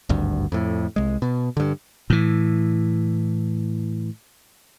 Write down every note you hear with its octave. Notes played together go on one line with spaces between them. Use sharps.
G#1 D2 G2
F2 A2
C2 G#3
B2
G2 D3
A2 E3